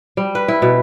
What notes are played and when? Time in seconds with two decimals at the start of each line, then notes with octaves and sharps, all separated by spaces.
0.17 G3
0.35 B4
0.48 E4
0.62 B2